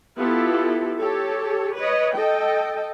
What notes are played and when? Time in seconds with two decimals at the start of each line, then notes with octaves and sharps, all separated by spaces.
0.18 B3 E4 F4 G4 A4
0.98 G4 A4 C#5
1.75 B4 C#5 D#5
2.14 A4 D#5 G5